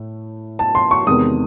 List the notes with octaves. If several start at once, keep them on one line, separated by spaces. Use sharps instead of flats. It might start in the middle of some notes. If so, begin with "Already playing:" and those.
Already playing: A2 A3
A5
C6
C#6
E2 C3 D#3 G#3 D#6